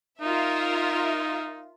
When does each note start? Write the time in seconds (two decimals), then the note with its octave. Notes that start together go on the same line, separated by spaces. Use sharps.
0.21 D#4 F4 A#4 E5